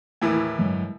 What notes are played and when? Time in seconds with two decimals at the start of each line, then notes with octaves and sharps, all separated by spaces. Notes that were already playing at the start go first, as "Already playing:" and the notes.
0.22 D#2 A2 E3
0.58 G1 F#3 G#3